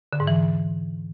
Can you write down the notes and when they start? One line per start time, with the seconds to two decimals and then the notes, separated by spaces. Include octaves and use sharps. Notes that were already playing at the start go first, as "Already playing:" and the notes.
0.13 D3
0.20 G#2
0.27 E3